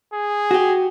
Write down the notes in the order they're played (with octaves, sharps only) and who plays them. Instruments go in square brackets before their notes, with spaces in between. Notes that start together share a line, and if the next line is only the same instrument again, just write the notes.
[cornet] G#4
[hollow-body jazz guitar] F#4 G4